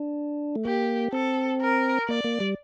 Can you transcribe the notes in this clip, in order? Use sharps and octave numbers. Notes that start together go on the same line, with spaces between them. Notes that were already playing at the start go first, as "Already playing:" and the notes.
Already playing: D4
A3
A#3 G4
C4 A4
A#4
A#3 D5
A#3
G3